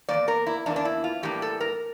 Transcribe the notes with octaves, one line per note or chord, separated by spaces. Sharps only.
E3 A#3 D5
E2
A#4
E4
E2 E3 A#3 D4
D4
E4
F4
A2 E3 G3 A#3 D4 G4
A4
A#4